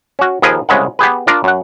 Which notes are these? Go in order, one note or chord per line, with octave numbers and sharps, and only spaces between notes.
C#4 F#4
D#2 F3 G#4 A#4 B4
C2 C#3 G#3 B4 F#5
B3 G4 G#4 B4
D4 F4 A#4 D5
F#2 F#5